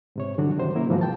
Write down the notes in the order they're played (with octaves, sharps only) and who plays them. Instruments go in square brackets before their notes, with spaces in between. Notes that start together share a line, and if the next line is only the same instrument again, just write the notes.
[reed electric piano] G#2 C3 C#5
G2 D3 E3 F#3 D4 F#4
C#2 C3 D#3 F#3 C5
A#3 C#4 E4 A#4
G#2 C3 E3 F3 G3 F#4
C2 G5 A5